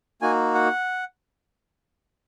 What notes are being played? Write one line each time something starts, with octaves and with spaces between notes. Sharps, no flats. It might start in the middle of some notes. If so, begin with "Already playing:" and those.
A#3 D#4 F#4 G#5
F#5